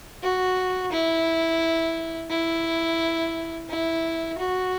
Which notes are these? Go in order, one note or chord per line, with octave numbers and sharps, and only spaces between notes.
F#4
E4
E4
E4
F#4